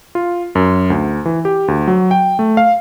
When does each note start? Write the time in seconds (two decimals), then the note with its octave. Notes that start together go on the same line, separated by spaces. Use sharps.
0.15 F4
0.55 F#2
0.90 D2
1.25 E3
1.45 G4
1.68 D2
1.88 F#3
2.11 G5
2.39 A3
2.57 F5